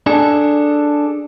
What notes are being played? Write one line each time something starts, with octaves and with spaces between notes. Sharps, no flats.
D4 G#4 A4